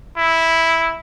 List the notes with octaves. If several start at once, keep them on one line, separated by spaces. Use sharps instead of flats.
E4